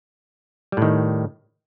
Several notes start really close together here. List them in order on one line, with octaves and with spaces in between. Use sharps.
G3 A2 D#3